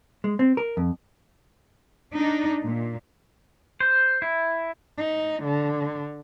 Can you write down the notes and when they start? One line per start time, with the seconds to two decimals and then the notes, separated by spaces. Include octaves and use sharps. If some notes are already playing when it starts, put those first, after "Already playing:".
0.24 G#3
0.39 C4
0.57 A#4
0.77 F2
2.15 D4 D#4
2.64 A#2
3.80 C5
4.22 E4
4.98 D#4
5.44 D3